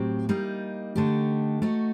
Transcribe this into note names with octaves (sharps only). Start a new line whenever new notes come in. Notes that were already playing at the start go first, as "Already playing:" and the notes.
Already playing: A2 F#3 C4 G4
G3 A#3 D#4
D3 A3 D#4 G4
A3 D#4 F#4